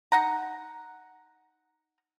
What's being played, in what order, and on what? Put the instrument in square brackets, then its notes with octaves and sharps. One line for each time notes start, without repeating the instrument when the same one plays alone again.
[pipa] D#4 F#5 A#5